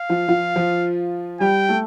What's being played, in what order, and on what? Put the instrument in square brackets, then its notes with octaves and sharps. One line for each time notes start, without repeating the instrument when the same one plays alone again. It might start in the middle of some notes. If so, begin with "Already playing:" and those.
Already playing: [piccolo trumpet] F5
[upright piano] F3 F4
F3 F4
F3 F4
[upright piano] G3 G4 [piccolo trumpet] G5
[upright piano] A3 A4